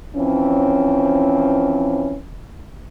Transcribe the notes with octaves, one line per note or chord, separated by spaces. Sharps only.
E3 F3 C4 C#4